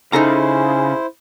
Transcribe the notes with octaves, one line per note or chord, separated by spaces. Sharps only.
C#3 D#4 E4 A4 C5 A#5